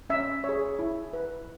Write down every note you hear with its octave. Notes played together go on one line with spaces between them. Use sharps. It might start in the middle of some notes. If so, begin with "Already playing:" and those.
C#4 E5
G#4 C#5
E4
B4